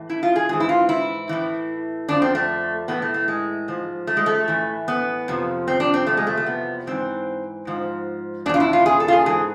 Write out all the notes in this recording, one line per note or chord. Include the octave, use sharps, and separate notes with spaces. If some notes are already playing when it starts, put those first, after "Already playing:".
Already playing: A2 E3
E4
F4
G#4
G#2 E3 G#4
E4
F4
E4
A2 E3
F2 D3 F3 D4
C4
A3
A2 E3 B3
A3
A3
G#3
G#2 F3
A3
G#3
A3
A2 E3
B3
F2 C3 F3
C4
D4
C4
E2 C3 F3 A3
G#3
A3
A3
B3
G#2 E3 C4
G#2 F3
E2 B2 D4 F4
E4
F4
G#4
A4
F4
G#4
G#2 E3 G#4